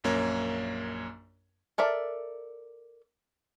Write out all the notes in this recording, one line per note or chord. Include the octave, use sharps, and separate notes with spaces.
A#1 F#2 A#3 C#5
A4 A#4 D5 E5